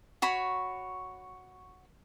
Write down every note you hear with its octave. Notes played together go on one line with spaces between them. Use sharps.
F#4 C#5 B5